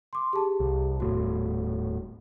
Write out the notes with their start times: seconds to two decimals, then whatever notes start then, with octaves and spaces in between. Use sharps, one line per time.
0.13 C6 D6
0.33 G4 G#4 A5
0.60 C2
1.00 D#1 A2 F#4